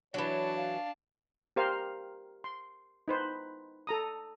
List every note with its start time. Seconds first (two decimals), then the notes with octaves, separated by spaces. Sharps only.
0.14 E3 F#3 D4 C#5 A5
0.57 F5
1.56 G4 A#4 C5 F5
2.44 C6
3.08 D#4 B4 C5
3.87 A4 A#5 D#6